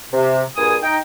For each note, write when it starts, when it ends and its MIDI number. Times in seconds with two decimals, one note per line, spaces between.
0.12 0.42 48
0.57 0.76 43
0.57 0.76 46
0.57 0.76 68
0.57 0.76 80
0.57 0.76 87
0.82 0.97 63
0.82 0.97 79